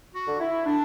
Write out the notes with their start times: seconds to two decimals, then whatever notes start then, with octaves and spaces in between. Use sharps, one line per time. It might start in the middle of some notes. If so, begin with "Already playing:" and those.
0.14 F#4
0.27 D3
0.40 E4
0.66 D4